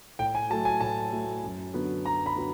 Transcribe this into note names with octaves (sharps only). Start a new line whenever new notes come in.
A2 G5
G#5
F#3 A3 A5
G#5
A2 A5
F#3 A3
F#2
D3 F#3 B3
F#2 A#5
B5
D3 F#3 B3